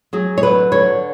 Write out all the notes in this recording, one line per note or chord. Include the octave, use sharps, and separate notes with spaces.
F#3 G#4
C#5
D3 B4
D3 C#5